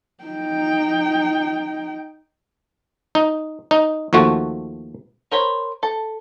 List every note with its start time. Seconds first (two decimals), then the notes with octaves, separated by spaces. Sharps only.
0.24 D#4 G5
3.15 D#4
3.71 D#4
4.13 D#2 F3 A3 F#4
5.31 A#4 C5 C#5 B5
5.83 A4